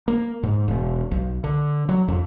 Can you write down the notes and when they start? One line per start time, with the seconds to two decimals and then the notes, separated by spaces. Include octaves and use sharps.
0.08 A#3
0.43 G#2
0.68 E1
1.11 B1
1.44 D3
1.89 F#3
2.08 F2